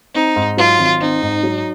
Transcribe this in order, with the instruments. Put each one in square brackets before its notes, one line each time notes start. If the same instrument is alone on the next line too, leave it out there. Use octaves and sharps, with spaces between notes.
[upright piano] C4 [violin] D#4
[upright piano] G#2
[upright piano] F#3 [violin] F4
[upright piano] G#1
[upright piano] C4 [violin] D#4
[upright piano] G#2
F#3